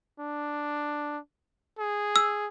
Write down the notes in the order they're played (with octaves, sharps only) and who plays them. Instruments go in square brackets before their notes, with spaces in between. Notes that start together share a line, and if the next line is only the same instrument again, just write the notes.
[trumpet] D4
G#4
[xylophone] E6